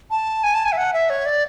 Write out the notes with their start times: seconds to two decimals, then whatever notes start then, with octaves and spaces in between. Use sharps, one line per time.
0.11 A5
0.44 G#5
0.54 A5
0.65 G#5
0.72 E5
0.77 F#5
0.94 E5
1.10 C#5
1.26 D5